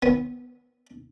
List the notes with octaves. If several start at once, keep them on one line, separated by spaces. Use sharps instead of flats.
B3